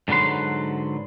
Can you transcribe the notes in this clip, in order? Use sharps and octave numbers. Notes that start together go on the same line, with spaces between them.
G#2 D3 F#3 B4 C6